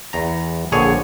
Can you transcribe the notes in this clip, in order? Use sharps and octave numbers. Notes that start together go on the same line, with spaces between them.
E2 A#5
A#1 D3 G#4 C#5